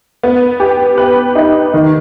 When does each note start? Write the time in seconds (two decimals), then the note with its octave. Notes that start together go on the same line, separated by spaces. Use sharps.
0.23 B3
0.60 G4
0.98 B4
1.35 D#4
1.74 D#3